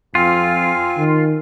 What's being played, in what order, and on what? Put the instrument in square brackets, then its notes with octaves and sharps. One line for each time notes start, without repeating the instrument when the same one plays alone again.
[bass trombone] F2 [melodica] C4 F5 G#5 [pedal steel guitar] F4
[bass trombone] D#3